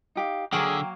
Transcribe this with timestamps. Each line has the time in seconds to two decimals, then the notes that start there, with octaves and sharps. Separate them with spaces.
0.15 D#4 G4 F5
0.53 D3 F#3 A#3 G#4 G5